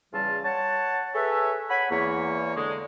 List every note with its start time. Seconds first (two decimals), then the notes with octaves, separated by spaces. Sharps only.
0.13 E2 C#3 G3 F4 A5
0.45 C#5 F#5 A5
1.14 G#4 A4 B4 C#5 E5
1.70 C#5 F#5 G#5 B5
1.91 E2 A#3 C#5
2.56 D3 G#3